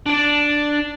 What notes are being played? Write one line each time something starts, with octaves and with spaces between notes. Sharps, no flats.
D4 D5